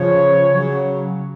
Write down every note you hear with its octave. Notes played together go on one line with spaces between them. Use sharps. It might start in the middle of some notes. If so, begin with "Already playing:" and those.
Already playing: C#3 F3 C#5
C#3 F#3